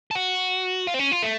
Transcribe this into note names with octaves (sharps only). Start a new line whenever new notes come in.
A4
F#4
F4
C4
C#4
F4
A3